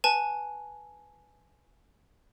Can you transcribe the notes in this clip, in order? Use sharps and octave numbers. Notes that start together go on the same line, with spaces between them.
B4 G#5 A5